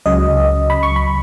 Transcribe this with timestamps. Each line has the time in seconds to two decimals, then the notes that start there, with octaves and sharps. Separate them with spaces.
0.06 C#2 C#3 F#3 D#5
0.70 B5
0.83 C#6
0.96 B5